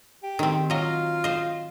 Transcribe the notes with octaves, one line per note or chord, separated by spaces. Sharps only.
G4
D#3 C4
F#3 F4 D#5
C5 D#5